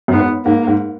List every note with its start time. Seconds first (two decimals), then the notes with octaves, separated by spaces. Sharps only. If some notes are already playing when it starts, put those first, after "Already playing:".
0.08 F#2
0.12 G#2 B3
0.45 G#2 A#3
0.67 G#2